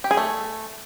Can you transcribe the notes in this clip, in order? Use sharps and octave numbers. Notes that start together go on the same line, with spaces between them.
G4
G#4
A3